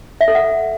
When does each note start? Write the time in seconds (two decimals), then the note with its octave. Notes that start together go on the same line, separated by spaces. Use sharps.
0.21 E5
0.28 A4
0.35 F#5